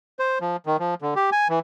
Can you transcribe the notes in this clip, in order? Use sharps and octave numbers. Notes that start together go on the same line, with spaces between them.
C5
F3
D#3
F3
D3
G4
G#5
E3